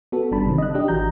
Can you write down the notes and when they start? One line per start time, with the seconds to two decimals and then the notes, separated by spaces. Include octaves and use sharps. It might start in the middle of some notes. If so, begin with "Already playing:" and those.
0.12 B3 F#4 A4
0.31 G1 G3 D4 A5 B5
0.46 C3 D#3 F#3 C4
0.58 D#5 F#6
0.74 D4 G4 D#5
0.88 G#1 E3 F#4 A#5 G6